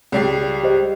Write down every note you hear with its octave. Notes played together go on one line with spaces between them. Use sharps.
C#2 G3 C7
G4 C5 D#5